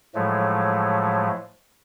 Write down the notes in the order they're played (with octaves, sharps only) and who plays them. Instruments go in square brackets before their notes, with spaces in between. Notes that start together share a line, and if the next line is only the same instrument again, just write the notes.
[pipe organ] A2 F3 F#3 G#3 A3